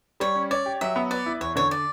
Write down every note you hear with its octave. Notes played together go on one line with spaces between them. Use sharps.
G3 C#5
C#4
C#5 D5
G4
F#3 E5
B3
B4 D5
E4
E2 C#5
D3 C#5
D5